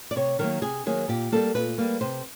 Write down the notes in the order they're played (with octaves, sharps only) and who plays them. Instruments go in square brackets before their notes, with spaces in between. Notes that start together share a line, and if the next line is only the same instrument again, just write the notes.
[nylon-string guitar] D5
C3 C#5
D#3 F#3 A#3 A#4
C3 G#4
D#3 F#3 A#3 G#4
A#2 G4
G3 A#3 A4
A#2 B4
G3 A#3
C3 C5